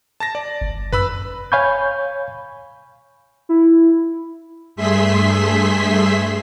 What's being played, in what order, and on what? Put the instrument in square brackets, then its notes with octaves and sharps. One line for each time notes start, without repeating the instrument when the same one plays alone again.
[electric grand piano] A5 A6 A#6
D5
[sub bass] G1
[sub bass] F#2 [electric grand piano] B4 B5 E6
[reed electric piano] C#5 F5 G#5 B5 C#6 G6
[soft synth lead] E4
[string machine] G2 A3 G#4 E5 C6 B6